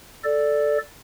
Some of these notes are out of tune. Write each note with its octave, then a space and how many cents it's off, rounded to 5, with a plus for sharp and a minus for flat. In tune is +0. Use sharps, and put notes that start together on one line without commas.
A4 +0 D5 +0